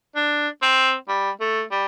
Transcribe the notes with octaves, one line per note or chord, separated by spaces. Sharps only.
D4
C4
G3
A3
G3